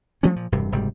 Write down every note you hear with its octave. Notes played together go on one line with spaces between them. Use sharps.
F3 G3 A3 C#4
A#2 F3
E1 G2 C3
F#1 G#2 C3 G3